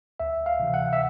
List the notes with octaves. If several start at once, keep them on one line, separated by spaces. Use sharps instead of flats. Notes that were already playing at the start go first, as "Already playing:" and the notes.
D2 E5
F5
C3 E3
F#5
E5